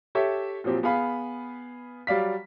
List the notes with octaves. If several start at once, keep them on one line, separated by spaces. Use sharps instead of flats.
G4 A4 C#5 E5
A#2 F3 F#3 C4 G4
B3 G#4 F5 B5
F#3 G3 D5 F5 B6